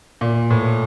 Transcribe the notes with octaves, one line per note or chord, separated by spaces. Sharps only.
A#2
A2